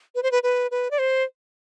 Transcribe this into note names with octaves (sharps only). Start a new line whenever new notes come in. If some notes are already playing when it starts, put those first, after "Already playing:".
B4
C5
B4
B4
B4
D5
C5